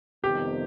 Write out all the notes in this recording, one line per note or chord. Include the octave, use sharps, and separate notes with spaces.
F2 C3 D#3 G3 B3 G4